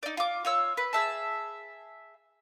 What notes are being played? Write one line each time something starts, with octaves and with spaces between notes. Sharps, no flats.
D#4 D5
F4 D6
F4 C#5 E6
B4
G#4 E5 A5